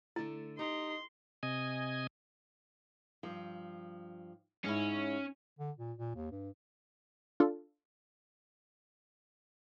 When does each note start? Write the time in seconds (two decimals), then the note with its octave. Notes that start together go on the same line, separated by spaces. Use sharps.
0.16 D3 A3 E4
0.59 D#4 G4 C6
1.43 C3 D#5 G#5
3.23 G2 F3
4.65 G#2 C#4 E4
5.59 D3
5.78 A#2
5.98 A#2
6.15 D#2
6.32 G2
7.40 D4 F4 A4